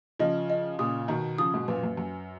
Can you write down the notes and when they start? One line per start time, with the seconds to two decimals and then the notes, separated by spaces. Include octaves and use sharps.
0.19 C#3 F3 D#5
0.50 D#5
0.79 A#2 C#3 D#6
1.08 B2 D#3 A#5
1.38 C#3 F3 D#6
1.54 G#2 B2
1.68 F#2 A#2 B4
1.83 F#2
1.97 F#2 G#5